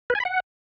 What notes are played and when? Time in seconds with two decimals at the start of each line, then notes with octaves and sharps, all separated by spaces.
0.10 B4
0.15 G#5
0.20 B5
0.25 F#5